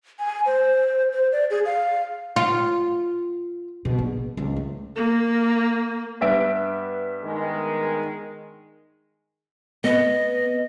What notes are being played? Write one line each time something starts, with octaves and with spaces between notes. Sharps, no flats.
G#5
C5
C5
D5
G#4
F5
F4
B2
A#1
C#2
A3
A#3
G2 B3 E5 D7
D#3 G#3
B3 D#5